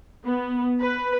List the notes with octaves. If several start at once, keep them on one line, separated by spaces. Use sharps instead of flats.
B3
B4